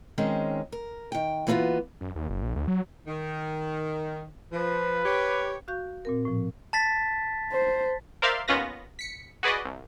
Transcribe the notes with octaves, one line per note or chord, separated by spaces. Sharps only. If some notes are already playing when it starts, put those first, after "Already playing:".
D#3 G#3 C4 C#4
A#4
D#3 G5
E3 A#3 B3 D#4 F4 F#4
F#2
D#2
F#1
A#1
D2
F#3
D#3
F3 B4
G4 C#5
F#4 F5 C#6 G6
A#2 C4 A#4
A2 F3
A5 A6 B6
C5
A#4 C5 D5 E5 F5 C6
D#2 B3 C#4 F4 B4 A#6
B6 C#7
F#4 G#4 B4 D5 D#5
C2